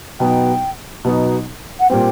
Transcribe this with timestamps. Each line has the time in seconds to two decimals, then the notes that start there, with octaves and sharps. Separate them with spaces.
0.20 B2 F#3 B3 D#4 G5
1.05 B2 F#3 B3 D#4
1.80 F#5
1.90 A#2 G3 C4 G5